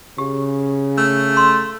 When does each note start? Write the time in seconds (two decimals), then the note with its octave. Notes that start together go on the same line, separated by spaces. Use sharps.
0.18 C#3 G4
0.98 A3
1.37 C6